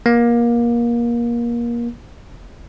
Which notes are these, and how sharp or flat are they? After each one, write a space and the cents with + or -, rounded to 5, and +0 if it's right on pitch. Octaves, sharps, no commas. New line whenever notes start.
A#3 +25